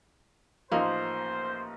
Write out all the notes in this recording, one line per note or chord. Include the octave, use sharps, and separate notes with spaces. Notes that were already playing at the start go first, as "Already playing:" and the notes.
A1 F3 A#3 D#4 C5